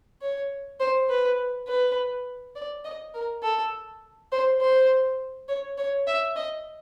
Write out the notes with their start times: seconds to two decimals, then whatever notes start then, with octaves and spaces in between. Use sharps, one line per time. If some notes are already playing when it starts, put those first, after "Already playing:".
0.22 C#5
0.80 C5
1.09 B4
1.68 B4
2.56 D5
2.85 D#5
3.14 A#4
3.43 A4
4.32 C5
4.61 C5
5.49 C#5
5.78 C#5
6.07 E5
6.36 D#5